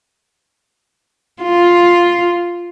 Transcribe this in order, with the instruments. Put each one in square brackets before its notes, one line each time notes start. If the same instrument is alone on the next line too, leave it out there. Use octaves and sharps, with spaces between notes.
[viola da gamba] F4